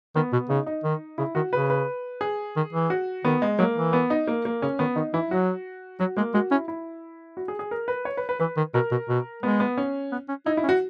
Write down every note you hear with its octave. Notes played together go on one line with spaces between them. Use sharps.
D#3 B3
B2
C#3 D#4
D#4
D#3
C#3 E4
D#3 F#4
C#3 B4
B4
G#4
D#3
E3
F#4
D#3 B3
G#3
F#3 A#3
E3
B3
D#4
A#3
A#3
C#3 C#4
D#3 B3
D#3 D#4
E3 E4
F#3 F#4
F#3 F#4
G#3 A#3
G#3 F#4
C#4 E4
E4
F#4
G#4
G#4
A#4
B4
C#5
B4
B4
E3 B4
D#3
B2 A#4
B2
B2
G#3 B3
B3
C#4
B3
C#4
D#4 E4
E4
C#4
F#4